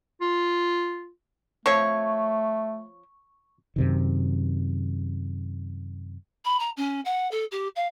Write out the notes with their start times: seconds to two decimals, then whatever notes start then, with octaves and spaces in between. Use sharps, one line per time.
0.21 F4
1.66 F3 A3 C4 C#5 C#6
3.76 F#2 C3 D#3
6.45 B5
6.59 A#5
6.77 C#4
7.05 F#5
7.31 A4
7.51 G4
7.75 F5